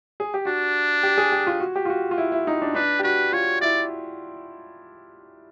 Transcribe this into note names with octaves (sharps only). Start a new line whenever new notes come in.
G#4
G4
D4 F#4
G4
G#4
G4
F4
F#4
G4
F4
F#4
F4
E4
E4
D#4
D4
D4 B4
G4
F#4 B4
F4 C#5
E4 D5